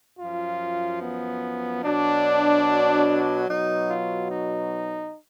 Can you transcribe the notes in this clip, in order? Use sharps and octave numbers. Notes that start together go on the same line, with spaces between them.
F#2 F3 F4
B3
B2 F#3 D4
B2 F#3 D#4
F4
D#4